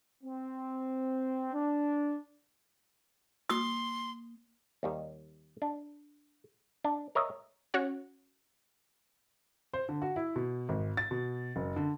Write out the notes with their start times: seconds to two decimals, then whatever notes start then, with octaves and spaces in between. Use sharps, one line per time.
0.24 C4
1.53 D4
3.50 A#3 C6 D#6
4.83 D#2 D#3 G3
5.62 D4
6.84 D4
7.15 A#4 C#5 D#5 E5
7.74 C#4 F#4 C#5 F#5
9.73 C5
9.89 D3
10.02 F#4
10.16 E4
10.36 B2
10.69 G#1
10.97 A6
11.11 B2
11.56 F#1
11.76 D3